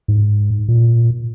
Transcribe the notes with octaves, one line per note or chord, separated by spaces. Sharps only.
G#2
A#2